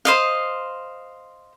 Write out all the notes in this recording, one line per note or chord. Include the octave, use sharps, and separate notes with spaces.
C5 D#5 F5